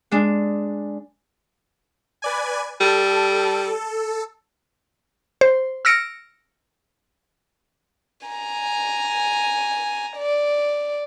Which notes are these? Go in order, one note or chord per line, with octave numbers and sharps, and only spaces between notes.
G#3 D4
B4 D5 G#5
G3 A4
C5
E6 F6 A#6 C#7 D7
G#5 A#5
D5